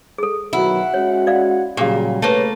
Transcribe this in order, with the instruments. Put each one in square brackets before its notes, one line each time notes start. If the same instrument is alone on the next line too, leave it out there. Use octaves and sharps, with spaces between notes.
[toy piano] G#4 A4
[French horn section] B2 D#3 F#3 [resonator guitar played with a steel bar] E4 [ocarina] F#5
[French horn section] G#3 C#4 F#4 [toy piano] C#5
[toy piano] D5 F5
[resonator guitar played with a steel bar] A#2 [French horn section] C#3 F#3 G3 [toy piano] G4 G#4 F5
[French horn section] C#3 B4 [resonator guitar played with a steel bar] A3 A#3 [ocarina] C#5